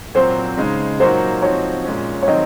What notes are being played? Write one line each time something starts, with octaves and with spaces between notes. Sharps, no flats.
A#2 F#3 C4 C5
C#3 G#3 D#4
A#2 F#3 A#3 D#4 F#4 C5
F3 C4 D#4 F#4 C#5
A#2 G#3 C#4
C#5
D#3 F#3 C4 D#5